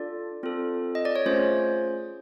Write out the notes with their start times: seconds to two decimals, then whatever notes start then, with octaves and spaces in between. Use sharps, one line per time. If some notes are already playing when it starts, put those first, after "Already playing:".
Already playing: D4 F4 A4 D5
0.43 C4 F4 A4
0.95 D#5
1.05 D5
1.16 C#5
1.26 A3 C#4 F4 G#4 C5